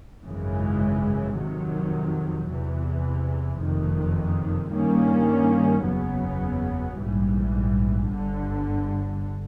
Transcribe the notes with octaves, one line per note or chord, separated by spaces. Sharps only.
G#1 F#2 C#3 E3 G#3
F2 C3 D#3 F#3
E2 C3 E3
F#1 F2 C3 D#3
G2 D#3 G3 A#3 C#4
F#1 E2 C#3 F#3 B3
A#1 G#2 E3 G3
G1 G2 D3